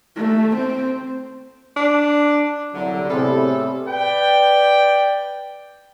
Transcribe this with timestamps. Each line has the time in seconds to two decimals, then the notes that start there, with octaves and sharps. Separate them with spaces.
0.16 A3
0.56 C4
1.76 D4
2.73 C2 D3 F#3
3.09 A2 C3 G3 B3 G#4 A4 C6
3.88 B4 D5 G5